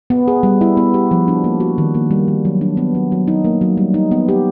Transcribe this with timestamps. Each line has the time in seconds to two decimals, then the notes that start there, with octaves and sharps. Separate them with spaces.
0.10 B3
0.28 G#4
0.43 G3
0.61 E4
0.77 B3
0.94 G4
1.11 F3
1.28 D4
1.44 A#3
1.60 F#4
1.78 D#3
1.95 A#3
2.11 G3
2.28 D#3
2.45 F#3
2.61 D4
2.77 B3
2.95 F#3
3.12 F#3
3.28 D#4
3.44 A#3
3.61 F#3
3.77 G3
3.94 D#4
4.11 B3
4.29 G4